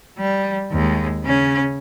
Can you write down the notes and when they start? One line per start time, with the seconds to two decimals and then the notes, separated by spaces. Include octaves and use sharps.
0.18 G3
0.72 D#2 G#3
1.24 C#3 C#4